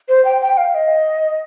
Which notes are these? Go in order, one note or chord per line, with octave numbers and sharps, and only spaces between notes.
C5
G5
G5
F5
D#5